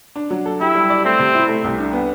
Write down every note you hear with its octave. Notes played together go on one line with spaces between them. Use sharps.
D4
F#3
A4
E4 G4
G3
D5
A3 C4
C3
E4
A3
C2
D4
B3